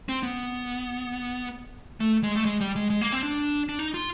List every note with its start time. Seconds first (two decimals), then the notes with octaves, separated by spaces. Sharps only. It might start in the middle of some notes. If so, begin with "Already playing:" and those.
0.09 C4
0.23 B3
2.00 A3
2.23 G#3
2.36 A3
2.45 G#3
2.61 G3
2.76 G#3
2.90 G#3
3.01 A#3
3.12 C4
3.23 D4
3.69 D4
3.79 D#4
3.94 F4